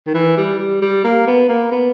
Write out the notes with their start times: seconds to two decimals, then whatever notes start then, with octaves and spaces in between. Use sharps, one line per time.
0.07 D#3
0.14 E3
0.37 G3
0.59 G3
0.82 G3
1.04 A#3
1.27 B3
1.49 A#3
1.72 B3